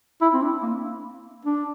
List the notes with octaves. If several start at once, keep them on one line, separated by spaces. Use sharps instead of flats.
E4
C4
D4
A#3
D4